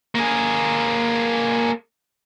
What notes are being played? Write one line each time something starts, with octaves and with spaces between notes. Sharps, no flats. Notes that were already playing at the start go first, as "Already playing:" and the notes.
A#3 G#4